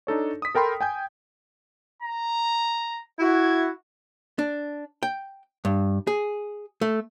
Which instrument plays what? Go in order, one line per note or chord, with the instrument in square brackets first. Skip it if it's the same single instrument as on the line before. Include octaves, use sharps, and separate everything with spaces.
[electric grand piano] D4 D#4 A4 C#5
D#6 B6
A4 A#4 G5 B5 C6
G5 G#5 G6
[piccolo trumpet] A#5
[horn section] E4 F#4 [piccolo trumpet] G#6
[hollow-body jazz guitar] D4
G5
G2
G#4
A3